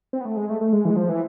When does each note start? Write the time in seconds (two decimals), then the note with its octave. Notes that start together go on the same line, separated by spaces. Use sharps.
0.13 C4
0.21 B3
0.25 A3
0.37 G#3
0.50 A3
0.61 A3
0.73 G#3
0.85 E3
0.90 G#3
0.96 F3
1.09 E3